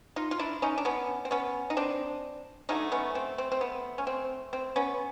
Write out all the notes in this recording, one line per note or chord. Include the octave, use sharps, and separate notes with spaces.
D#4 F4
F4
D4 E4
C#4 D#4
D4
B3 C#4
C4
B3 C#4
D#4
C4 D4
D3 F#3 A3 C#4 D#4
B3 C#4
C4
C4
C4
B3
C#4
C4
C4
B3 C#4